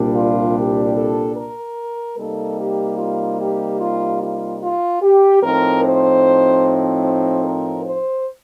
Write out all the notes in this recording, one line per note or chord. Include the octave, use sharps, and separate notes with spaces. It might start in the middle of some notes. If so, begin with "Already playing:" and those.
Already playing: C2 A#2 G3 D4
F4
G4
A4
A#4
C3 G3 A#3 D#4 A4
G4
F4
G4
F4
F4
F4
G4
A2 F3 C4 D#4 A#4
C5
C5
A#4
C5